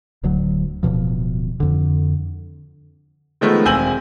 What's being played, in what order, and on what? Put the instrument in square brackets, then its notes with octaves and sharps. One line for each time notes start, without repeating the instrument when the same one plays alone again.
[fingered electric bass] D1 D2 F#3
D1 B1 B2 F3
F2 D3
[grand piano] D#3 F3 G#3 A3 B3
E1 C4 G#5 E6 G6 F#7